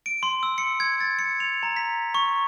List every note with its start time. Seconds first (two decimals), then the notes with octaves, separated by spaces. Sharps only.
0.06 D7
0.23 C6
0.43 E6
0.58 C#7
0.80 G#6
1.00 A6
1.19 C#7
1.40 F7
1.63 A#5
1.76 B6
2.14 C#6